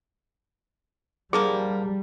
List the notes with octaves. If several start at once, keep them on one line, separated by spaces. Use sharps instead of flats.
D3 F3 G3 A#3 G#4